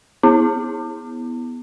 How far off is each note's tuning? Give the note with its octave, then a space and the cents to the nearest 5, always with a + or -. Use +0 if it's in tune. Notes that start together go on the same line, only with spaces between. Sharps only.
B3 +0 E4 -25